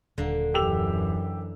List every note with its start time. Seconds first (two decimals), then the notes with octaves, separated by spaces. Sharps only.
0.18 D#1 D3 A#3
0.54 F#2 E3 G4 E6 F7